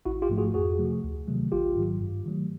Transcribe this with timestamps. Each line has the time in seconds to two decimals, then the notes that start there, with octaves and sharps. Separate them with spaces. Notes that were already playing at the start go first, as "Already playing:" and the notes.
0.05 A1 E4 F#4
0.22 F4 G4
0.29 G#2 F3 A3
0.38 F#4 G#4
0.54 F2 F#4 G#4
0.79 C3 F3 A3
1.04 D2
1.27 C3 D#3 F#3 A3
1.52 A1 F4 G4
1.76 G#2 D#3 F#3
2.01 G2
2.26 D#3 F#3 A3